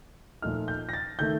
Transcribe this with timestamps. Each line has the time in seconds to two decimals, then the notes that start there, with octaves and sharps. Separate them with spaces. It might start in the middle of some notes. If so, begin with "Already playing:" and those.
0.42 A#2 F3 A3 D#4 F6
0.68 G6
0.89 A#6
0.93 A6
1.19 D#3 A3 G6